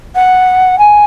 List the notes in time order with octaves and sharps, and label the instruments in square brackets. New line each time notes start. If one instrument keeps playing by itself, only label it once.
[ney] F#5
G#5